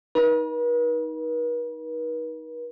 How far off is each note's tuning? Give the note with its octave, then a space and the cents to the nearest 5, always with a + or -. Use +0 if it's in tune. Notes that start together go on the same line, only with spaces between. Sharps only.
D#4 +15 B4 -45